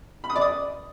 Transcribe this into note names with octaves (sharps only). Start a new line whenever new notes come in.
B5
D#6
D5
D#6